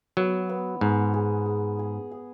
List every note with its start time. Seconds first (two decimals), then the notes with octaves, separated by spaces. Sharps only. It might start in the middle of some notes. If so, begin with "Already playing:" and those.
0.17 F#3 B3
0.49 B3
0.81 G#2 B3
1.14 G#4
1.46 G#4
1.79 G#4
2.11 G#4